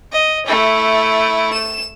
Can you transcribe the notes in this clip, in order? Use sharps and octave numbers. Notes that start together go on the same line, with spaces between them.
D#5
A3 E4
E7